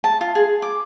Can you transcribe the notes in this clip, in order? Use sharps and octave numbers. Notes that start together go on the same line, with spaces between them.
A5
F4
G#4
D6